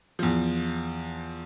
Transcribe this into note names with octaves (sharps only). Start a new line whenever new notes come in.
E2 F3